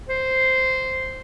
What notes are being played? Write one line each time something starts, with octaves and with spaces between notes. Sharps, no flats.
C5